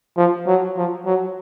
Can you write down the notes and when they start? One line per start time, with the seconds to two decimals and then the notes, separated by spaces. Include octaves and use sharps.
0.17 F3
0.47 F#3
0.77 F3
1.06 F#3